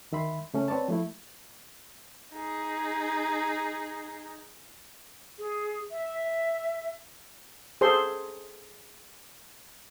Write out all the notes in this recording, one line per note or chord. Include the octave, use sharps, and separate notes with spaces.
D2 D#3 E5 B5 C6
C#3 A3 C#4
C4 B4 C#5 D5 A5
F3 A3 E4
D#4 G#4
G#4
E5
G#4 A4 C5 C6